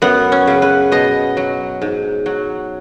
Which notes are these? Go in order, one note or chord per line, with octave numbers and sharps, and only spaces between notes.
F#2 B3
C#4
C#3 F#3
B4
B2 D#5
F#3
G#2
F#3